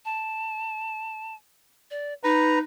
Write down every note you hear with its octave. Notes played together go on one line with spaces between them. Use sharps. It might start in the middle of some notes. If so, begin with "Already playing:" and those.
A5
D5
D#4 B4 A#5